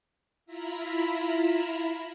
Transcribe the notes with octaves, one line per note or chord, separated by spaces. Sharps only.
E4 F4 E5 A#5 B5